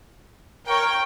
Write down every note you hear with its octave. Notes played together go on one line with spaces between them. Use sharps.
A#4 C#5 G5 C#6